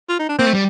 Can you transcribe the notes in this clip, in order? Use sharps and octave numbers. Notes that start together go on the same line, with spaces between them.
F4
D#4
D4
A#3 C4
A3
G3